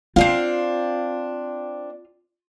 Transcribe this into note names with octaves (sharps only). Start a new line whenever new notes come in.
C4 D4 F4 F5